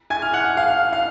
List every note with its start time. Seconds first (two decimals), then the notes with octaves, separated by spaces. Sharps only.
0.10 G#5 G#6
0.22 F6
0.33 F#5 F#6
0.57 F5 F6
0.93 F5 F6